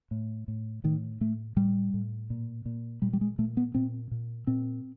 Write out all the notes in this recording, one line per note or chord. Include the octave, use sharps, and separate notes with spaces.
A2
A2
A2 D#3
A2 A3
A2 G3
A2
A#2
A#2
A#2 G3
G3
G#3
A#2 A3
B3
A#2 C4
A#2
A#2 C4